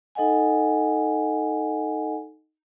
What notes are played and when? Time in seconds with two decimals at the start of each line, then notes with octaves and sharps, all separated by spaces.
0.15 D#4 A4 D#5 F#5 G#5